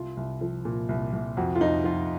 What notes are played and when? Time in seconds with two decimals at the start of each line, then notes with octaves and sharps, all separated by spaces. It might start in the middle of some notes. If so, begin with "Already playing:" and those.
Already playing: C2 F4
0.17 C2
0.41 F3
0.65 A#2
0.89 C2
1.13 C2
1.37 F2 F#4
1.55 F4
1.60 F2 D#4
1.84 F3 F4